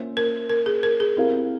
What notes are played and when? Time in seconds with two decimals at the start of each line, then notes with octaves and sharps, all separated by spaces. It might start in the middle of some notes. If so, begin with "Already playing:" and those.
Already playing: A#3 C#4 F4 C5 E5
0.17 A#4
0.50 A#4
0.66 G#4
0.83 A#4
1.00 G#4
1.17 C4 E4 G4 A#4 F5